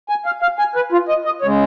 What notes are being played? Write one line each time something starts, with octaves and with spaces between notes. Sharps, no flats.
G#5
F5
F5
G#5
B4
F4
D#5
D#5
C#3 G#3 C#5